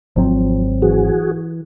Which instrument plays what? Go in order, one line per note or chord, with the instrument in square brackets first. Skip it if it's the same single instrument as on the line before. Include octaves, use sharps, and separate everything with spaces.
[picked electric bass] G#1 F#3 C4 [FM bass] F3
[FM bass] E3 [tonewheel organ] F#4 G#4